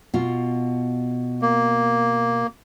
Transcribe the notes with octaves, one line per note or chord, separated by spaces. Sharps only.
B2 F4
A#3